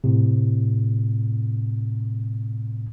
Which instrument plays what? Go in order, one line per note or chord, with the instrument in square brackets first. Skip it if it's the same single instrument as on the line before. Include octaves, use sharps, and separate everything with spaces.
[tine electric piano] A2 C3